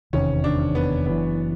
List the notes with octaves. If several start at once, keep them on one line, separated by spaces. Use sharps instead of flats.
F1 E2 C3 D#3 C#4
D4
B3
F#1 F#2 C#3 E3 B3